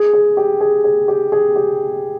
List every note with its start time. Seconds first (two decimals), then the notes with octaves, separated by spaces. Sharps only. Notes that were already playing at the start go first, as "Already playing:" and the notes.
Already playing: G#4
0.13 G#4
0.37 G4
0.60 G#4
0.84 G#4
1.08 G4
1.32 G#4
1.56 G4